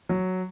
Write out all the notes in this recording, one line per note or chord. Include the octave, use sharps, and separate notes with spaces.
F#3